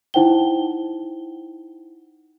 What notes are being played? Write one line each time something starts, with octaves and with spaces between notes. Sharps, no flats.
D#4 E4 C5 F#5 G5 G7